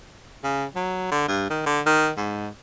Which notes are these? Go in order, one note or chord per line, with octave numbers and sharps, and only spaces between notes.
C#3
F#3
D3
G2
D#3
D3
D#3
G#2